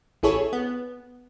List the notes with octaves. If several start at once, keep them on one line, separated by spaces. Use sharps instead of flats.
A1 E4 G#4 A4 C#5
B3